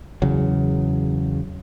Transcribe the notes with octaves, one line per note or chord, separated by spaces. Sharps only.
E2 C#3 F#3